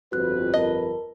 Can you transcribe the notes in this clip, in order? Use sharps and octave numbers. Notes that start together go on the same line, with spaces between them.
G1 F2 F#4 B4 F#6
A#4 D#5 A5